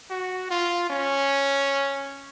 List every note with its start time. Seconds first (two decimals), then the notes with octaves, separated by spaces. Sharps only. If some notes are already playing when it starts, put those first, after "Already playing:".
0.10 F#4
0.50 F4
0.90 C#4